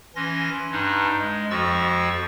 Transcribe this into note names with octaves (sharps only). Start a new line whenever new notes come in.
E3 C#4 C6 A#6
G2 D4 D#4
G#3
F2 F3 F#4 C#6 E6 A6